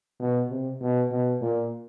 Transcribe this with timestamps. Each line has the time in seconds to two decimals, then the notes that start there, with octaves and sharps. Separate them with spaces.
0.20 B2
0.50 C3
0.81 B2
1.11 B2
1.42 A#2